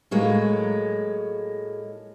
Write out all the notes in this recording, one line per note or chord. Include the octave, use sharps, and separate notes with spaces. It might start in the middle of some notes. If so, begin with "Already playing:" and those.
A2 F#3 G#3 A#3